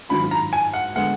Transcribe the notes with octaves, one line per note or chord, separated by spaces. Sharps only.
G#2 D#3 F#3 D4 F4 B5
A#5
G#5
F#5
D3 G#3 B3 F#5